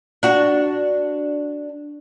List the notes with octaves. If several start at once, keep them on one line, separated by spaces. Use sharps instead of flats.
D4 F#4